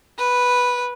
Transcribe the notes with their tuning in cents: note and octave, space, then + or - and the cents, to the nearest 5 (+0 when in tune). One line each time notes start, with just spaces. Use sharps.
B4 -5